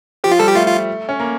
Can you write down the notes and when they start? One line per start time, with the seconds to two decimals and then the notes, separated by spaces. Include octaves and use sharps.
0.24 F3 G4
0.31 F4
0.39 G3 A4
0.48 G4
0.55 A3 F4
0.67 F4
1.09 C#4
1.20 A#3